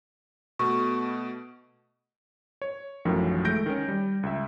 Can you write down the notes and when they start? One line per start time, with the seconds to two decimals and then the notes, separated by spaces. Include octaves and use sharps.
0.59 B2 A3 B3 C#6
2.62 C#5
3.05 A1 F#2 A2 D#3 F3
3.44 G#3 A3 G6 A#6 D7
3.66 D#3 C#4
3.88 G3
4.23 C#2 E5